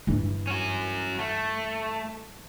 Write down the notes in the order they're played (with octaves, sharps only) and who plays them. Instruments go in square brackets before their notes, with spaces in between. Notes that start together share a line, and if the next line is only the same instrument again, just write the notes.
[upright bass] G2 E3
[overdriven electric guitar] C#4 F#4
A3